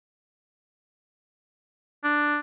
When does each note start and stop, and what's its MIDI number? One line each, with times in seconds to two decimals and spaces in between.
2.04 2.39 62